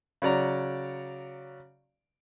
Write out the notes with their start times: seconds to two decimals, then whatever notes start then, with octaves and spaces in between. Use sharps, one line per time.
0.22 C#3 F#3 D5 A#5